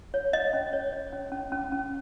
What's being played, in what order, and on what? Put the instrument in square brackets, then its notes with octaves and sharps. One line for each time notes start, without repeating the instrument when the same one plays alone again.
[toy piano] C#5
C#5 D#5
C#4
C#5
C#5
C#4
C#4
C#4
C#4